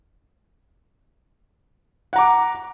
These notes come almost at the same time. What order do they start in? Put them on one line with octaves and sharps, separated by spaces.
F#5 A#5 D6